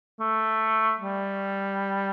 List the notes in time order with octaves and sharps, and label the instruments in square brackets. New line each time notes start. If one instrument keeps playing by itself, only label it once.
[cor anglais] A3
G3